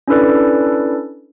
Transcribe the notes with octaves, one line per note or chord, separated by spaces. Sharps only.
C#4 D4 E4 A4 B4 D5